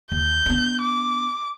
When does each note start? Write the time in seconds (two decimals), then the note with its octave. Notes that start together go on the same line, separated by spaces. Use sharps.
0.12 D#2 G6
0.46 B3 D4
0.82 D6